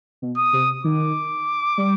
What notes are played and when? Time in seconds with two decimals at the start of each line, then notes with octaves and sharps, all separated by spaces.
0.22 B2
0.37 D#6
0.53 C3
0.84 D#3 D6
1.78 G3